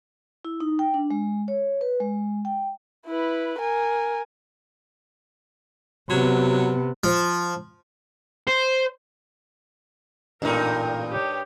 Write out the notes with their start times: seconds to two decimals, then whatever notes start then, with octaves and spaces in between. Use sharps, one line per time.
0.45 E4
0.60 D#4
0.79 G5
0.94 D4
1.11 G#3
1.48 C#5
1.81 B4
2.00 G#3
2.45 G5
3.07 E4 B4
3.59 A#4 G#5
6.10 C3 F#3 B3
7.04 F3
8.48 C5
10.42 A1 G2 A#2 D#4 A#4
11.11 G4 C#5